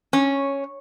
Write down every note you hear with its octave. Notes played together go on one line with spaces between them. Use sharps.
C#4